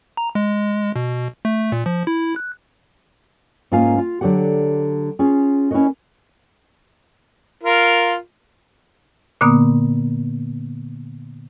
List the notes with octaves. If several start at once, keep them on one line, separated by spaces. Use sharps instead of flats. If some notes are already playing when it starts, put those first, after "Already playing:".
A#5
G#3
B2
A3
A#2
F3
E4
F#6
G#2 A#3 C#4 F4 F5 G#5
F4
D3 F#3 F#4 G4 F#5
C#4 F4 G#4
C#4 E4 A#4 B4 C#5 D#5
F4 A#4
A#2 D3 A#3 B3 D#6